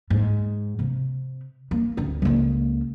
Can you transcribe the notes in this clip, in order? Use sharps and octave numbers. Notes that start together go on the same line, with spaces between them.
G#2
C3
A#3
D2 C4
C#2 A#3